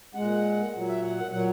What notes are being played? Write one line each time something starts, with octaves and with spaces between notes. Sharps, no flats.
A#2 G#3 F#5
A#2 F#3
E5
F#5
A#2 F#3 F#5